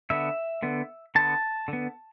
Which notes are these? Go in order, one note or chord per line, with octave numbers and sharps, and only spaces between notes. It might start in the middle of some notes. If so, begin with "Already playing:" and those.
D3 B3 E5
D3 B3
D3 B3 A5
D3 B3